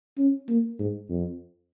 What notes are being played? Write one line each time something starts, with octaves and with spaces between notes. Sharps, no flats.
C#4
A#3
G#2
F2